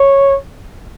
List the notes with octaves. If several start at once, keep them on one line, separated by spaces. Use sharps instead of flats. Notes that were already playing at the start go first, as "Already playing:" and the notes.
Already playing: C#5